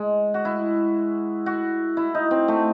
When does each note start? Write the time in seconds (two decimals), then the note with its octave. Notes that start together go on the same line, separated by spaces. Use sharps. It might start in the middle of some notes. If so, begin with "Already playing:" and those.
Already playing: G#3
0.34 F#4
0.45 E4
1.46 F#4
1.97 E4
2.15 D#4
2.31 C4
2.48 A3